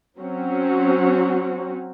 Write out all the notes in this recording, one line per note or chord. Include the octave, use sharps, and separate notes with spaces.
F#3 C4 C#4 F#4